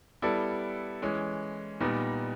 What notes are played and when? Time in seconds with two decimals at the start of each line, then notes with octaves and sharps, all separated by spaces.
0.22 G3 B3 E4 A4 D5
1.02 E3 G#3 C#4
1.80 A#2 G3 B3 D#4